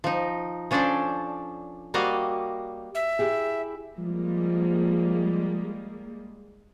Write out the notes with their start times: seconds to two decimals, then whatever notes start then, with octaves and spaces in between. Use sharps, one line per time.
0.04 F3 D#4
0.71 F3 C#4 D4 A4 C5 D5
1.94 G3 A#3 F#4 D#5 F5
2.95 E5
3.19 E4 G4 G#4
3.99 F3 G3 G#3 A#3